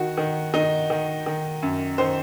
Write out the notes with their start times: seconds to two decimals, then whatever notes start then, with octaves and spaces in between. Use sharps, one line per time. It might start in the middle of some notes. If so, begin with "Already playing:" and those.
Already playing: D#3 F#4
0.17 D#3
0.54 D#3 D#4
0.90 D#3
1.26 D#3
1.63 F#2
1.98 D#3 C5